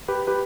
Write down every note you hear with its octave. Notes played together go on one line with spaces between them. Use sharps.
G4 B4
G4 B4